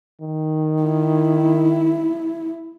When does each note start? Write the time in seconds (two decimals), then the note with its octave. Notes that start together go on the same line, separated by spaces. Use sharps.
0.21 D#3
0.83 E4